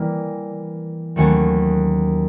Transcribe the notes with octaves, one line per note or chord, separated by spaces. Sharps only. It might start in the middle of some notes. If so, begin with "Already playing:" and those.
Already playing: E3 G3 A#3
D#2 D#3 F#3 A3 C#4